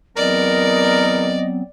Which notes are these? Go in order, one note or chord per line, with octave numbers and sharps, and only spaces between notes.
E2 F#3 B3 C4 A#4 D5 D#5